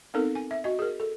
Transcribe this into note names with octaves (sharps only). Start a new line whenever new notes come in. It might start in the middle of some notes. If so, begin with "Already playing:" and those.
B3 C4 D#4 A4 A#4
G#5
E5
F#4 D#5
G#4 A#4
A4